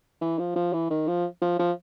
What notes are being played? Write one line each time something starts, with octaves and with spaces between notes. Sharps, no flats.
E3
F3
F3
E3
D#3
F3
F3
F3